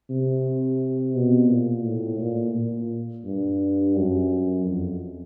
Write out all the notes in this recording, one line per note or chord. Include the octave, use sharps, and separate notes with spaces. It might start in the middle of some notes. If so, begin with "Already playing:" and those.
C3
B2
A#2
A2
A#2
A#2
G2
F#2
F2